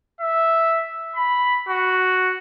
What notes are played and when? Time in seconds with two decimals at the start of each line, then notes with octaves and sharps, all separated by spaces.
0.20 E5
1.16 B5
1.69 F#4